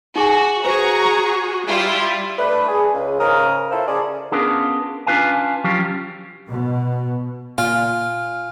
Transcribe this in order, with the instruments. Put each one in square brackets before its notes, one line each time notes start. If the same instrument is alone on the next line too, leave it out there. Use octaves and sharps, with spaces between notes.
[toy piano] D#4 G#4 G#5 [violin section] F#4
[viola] F#4 G#4 [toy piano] B4 C5 [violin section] A#5 C#6
[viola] G3 [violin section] E4 F4 G4
[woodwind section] A3 D4 B4
G#4
C#2
G#2 C#3 A#4 D#6
E4 F4 A4 C5
C#3 C#4 G#4 D5
[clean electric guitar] B3 C#4 D4 F4 G#4 A#4
C#4 D4 F4 B4 F5 G#5
F3 F#3 C#4 F4 G4
[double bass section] B2
[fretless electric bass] A#2 [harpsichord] F4 [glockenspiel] G#5 F6